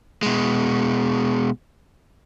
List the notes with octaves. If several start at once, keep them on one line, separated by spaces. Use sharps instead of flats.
B2 G#3